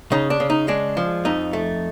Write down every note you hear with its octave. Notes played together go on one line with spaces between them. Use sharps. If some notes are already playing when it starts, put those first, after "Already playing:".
C#3 D#4
D4
C#3
D#4
G#3 D4
F3
F2 D#4
A3